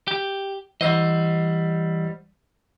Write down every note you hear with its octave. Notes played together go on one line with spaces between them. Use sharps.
G4
E3 G3 C5 D#5 F#5 E6